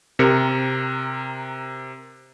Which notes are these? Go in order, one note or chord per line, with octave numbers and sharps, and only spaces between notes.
C3 A#4 C#7